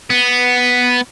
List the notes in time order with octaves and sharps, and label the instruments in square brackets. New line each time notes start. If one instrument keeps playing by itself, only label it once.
[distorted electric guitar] B3